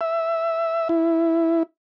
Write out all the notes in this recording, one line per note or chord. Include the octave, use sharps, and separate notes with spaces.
E5
E4